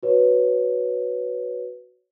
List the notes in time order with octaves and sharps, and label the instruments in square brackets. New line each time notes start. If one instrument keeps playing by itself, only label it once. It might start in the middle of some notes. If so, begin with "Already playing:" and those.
[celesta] F#4 B4 C#5